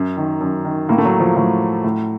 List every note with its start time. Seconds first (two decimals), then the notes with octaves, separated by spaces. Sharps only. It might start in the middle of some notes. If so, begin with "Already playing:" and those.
Already playing: F#2
0.17 D#3
0.41 F#2
0.65 D#3
0.89 A2 A#3
0.98 A3
1.05 F#3
1.20 F3
1.36 A2 F#3
1.84 A2